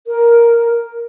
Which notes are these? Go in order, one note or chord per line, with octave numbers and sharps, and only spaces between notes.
A#4